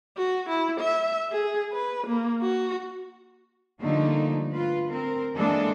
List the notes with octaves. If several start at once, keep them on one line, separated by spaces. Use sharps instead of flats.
F#4
E4
E5
G#4
B4
A#3
F#4
D3 F3 G3 A3 A#3 D#4
F4 B4
C4 A#4
E3 G#3 A#3 D4 A4